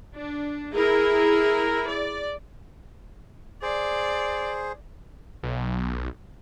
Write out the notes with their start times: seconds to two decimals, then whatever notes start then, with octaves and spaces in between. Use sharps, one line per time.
0.15 D4
0.74 E4 G#4 A#4
1.88 D5
3.62 G#4 C5 D5
5.43 B1